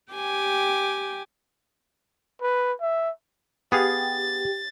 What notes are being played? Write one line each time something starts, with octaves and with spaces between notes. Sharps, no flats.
G4 G5 G#5 D6
B4
E5
B3 G4 G#4 F5 A6